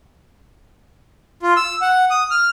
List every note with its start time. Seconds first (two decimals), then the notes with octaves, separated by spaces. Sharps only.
1.43 F4
1.57 E6
1.81 F#5
2.11 D#6
2.31 F6